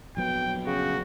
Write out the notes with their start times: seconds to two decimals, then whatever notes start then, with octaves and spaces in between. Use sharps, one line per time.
0.17 A#1 F#3 B3 G5
0.67 C#3 F#4